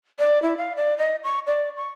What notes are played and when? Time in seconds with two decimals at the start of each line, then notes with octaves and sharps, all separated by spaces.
0.19 D5
0.42 E4
0.57 F5
0.76 D5
0.98 D#5
1.24 C#6
1.47 D5
1.77 C#6